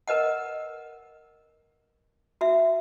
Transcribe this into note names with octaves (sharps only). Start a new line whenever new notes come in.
A#4 B4 D#5 F#5
F#4 E5